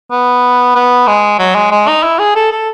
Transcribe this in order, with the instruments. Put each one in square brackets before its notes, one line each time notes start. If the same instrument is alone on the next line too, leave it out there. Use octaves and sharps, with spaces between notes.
[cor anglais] B3
B3
G#3
F#3
G#3
G#3
D#4
E4
G#4
A4
A4